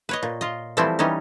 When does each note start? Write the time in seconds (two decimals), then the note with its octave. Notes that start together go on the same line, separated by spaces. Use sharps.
0.09 B4 C#5 D#5
0.23 A#2
0.41 F4 D#5
0.77 E3 F3 G3 A3 C4 E4
0.99 E3 G3 C#4 D#4